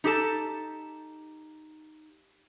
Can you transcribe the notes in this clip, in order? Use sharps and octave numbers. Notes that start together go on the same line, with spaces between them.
D#4 G4 A4 A5